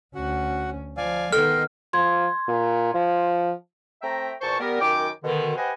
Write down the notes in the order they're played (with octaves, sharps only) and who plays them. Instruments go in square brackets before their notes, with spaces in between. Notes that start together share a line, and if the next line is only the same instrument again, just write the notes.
[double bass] D2 C#4 [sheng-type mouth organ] F#4 F#5
[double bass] F3 [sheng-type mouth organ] D5 F5 G#5
[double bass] D#3 B3 [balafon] A4 [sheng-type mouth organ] D#5 G5 C6 [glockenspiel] F6
[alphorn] F3 [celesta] C6 G#6
[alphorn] A#2
F3
[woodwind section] A3 C4 E5 G5 A#5
E2 A#2 C5 A5 C#6
G3 B3 A#4
F#2 D#3 G5 D6
B2 D3 D#3
G4 B4 C5 D#5 F#5 G#5